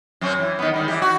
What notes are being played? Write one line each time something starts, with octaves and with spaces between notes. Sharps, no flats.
F#2 C4 C#4
E3
D#3 B3
G#2 D#3 G3
E3 G4
F#4